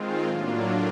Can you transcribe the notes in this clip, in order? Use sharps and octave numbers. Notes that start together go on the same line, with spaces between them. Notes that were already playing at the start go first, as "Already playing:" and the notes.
Already playing: D#3 G#3 C4 F4
A2 F#3 A#3 D4 F4